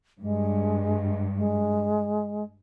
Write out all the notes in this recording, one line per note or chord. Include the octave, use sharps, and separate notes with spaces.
G2 G#3
G#3